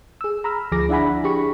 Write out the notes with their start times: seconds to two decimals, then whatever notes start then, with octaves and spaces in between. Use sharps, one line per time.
0.21 G#4 E6
0.44 A#5 B5 E6 F6
0.72 D2 F3 G#4 D6 A#6
0.89 D4 E4 E5 F#5 G#5 B5
1.24 D4 G4 G#4 B5 C#6